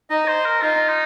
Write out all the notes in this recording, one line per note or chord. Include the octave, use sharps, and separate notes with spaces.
D#4 D#5
C5
A#4
D#4 F4
D#4